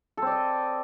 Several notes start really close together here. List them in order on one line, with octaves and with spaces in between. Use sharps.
A4 C4 D5 D#5